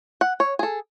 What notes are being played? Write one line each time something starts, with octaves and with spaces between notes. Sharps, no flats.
F#5
C#5
G#4 A4